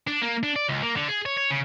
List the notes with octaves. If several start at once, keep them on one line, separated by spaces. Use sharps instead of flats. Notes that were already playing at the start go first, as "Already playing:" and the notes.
D4
A#3
D4
D5
C#2
A#3
D3
G#4
C#5
C#5
C#3